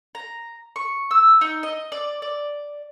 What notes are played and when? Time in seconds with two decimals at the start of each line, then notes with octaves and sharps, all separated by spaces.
0.15 A#5
0.76 C#6
1.11 E6
1.41 D#4
1.63 D#5
1.92 D5
2.22 D5